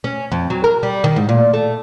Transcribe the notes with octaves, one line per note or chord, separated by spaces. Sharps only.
C#4
F2
F#3
A#4
G3
D#3
G#2
A#2
A3